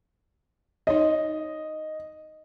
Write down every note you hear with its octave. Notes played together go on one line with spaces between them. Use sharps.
D#4 C#5 D#5